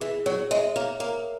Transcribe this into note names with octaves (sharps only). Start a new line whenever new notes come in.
E3 G#4
F#3 C#5
G#3 E5
A#3 C#5
A#3 A#4